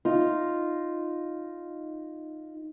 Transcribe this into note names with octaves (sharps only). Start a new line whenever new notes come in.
D#4 F4